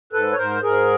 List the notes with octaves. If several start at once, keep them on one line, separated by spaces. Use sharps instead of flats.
G#2 A4 B4
C#5
G#2 A#4 C5
G#2 G#4 A#4